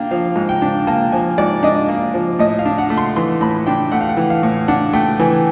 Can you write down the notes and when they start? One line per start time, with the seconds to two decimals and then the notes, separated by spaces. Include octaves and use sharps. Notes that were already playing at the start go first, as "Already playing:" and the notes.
Already playing: A#3 D4 G5
0.11 F3 F5
0.36 G#2
0.49 G5
0.62 D4
0.87 A#3 A5
1.12 F3 G#5
1.38 G#2 D5
1.63 D4 D#5
1.89 A#3
2.14 F3
2.39 A2 D#5
2.59 F5
2.66 D4
2.78 F#5
2.90 A3
2.97 C6
3.16 E3 C6
3.41 A2 B5
3.67 D4 G5
3.92 A3 F#5
4.01 F5
4.09 F#5
4.17 E3
4.30 F5
4.43 A2
4.68 D4 F#5
4.93 A3 G5
5.19 E3 G#5